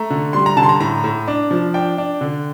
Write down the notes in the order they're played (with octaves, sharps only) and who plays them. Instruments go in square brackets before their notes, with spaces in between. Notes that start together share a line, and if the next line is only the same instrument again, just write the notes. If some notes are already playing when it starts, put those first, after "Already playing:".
Already playing: [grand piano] A3 A#5
D3
G3 C6
A#5
D3 A5
C6
A#5
A2 A#5
A2
D4
F3
D4 G5
D4
D3